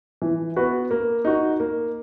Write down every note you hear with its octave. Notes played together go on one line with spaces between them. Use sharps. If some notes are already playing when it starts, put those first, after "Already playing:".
E3
B3 F#4 B4
A#3
D#4 F#4
A#3